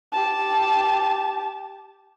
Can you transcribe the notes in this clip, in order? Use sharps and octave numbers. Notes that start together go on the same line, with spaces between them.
G4 A5